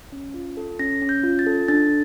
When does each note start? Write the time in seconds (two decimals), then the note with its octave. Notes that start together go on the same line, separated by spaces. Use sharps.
0.12 C#4
0.34 F4
0.57 A4
0.79 C#4 A#6
1.02 C#4
1.09 G6
1.23 F4
1.39 A6
1.46 A4
1.68 D4 A6